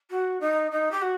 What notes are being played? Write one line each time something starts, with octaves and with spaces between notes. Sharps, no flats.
F#4
D#4
D#4
G4
F#4